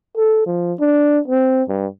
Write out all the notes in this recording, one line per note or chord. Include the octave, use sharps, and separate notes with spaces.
A4
F3
D4
C4
G2